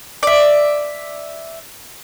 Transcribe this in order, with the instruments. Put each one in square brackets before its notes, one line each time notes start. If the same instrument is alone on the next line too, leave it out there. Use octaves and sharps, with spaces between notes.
[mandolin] D5 E5